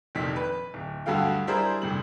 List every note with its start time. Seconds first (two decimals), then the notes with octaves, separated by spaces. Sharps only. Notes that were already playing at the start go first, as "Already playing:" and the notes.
0.15 F1 A#1 D#3 B6
0.36 B4
0.74 D1
1.06 D2 G2 F#4 A4 F5 G5
1.47 G3 D4 E4 G#4 A#4 C5
1.82 F1 G2 F#7